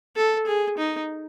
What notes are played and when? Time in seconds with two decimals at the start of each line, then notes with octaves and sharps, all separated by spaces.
0.16 A4
0.47 G#4
0.78 D#4